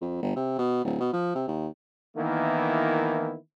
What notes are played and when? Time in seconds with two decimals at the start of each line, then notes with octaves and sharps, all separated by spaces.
0.02 F2
0.22 G1
0.36 C3
0.58 B2
0.85 D1
1.00 B2
1.13 F3
1.35 C3
1.48 D#2
2.17 D#3 E3 A#3 B3 E4